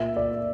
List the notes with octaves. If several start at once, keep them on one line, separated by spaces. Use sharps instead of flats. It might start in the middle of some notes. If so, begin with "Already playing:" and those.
Already playing: A#2 A#3 E5
D5